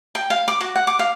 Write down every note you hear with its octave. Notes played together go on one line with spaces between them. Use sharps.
G5
F5
D6
F#4
F#5
D6
F5